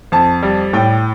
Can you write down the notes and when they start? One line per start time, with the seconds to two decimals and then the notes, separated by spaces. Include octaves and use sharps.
0.12 F2 A5
0.43 G3
0.73 A2 G5